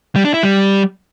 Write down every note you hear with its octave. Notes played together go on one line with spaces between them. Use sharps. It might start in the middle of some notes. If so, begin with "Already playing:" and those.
G3
D4
E4
G3